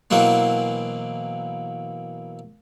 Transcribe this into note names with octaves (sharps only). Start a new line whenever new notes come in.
B2 E3 F#3 A#3 C4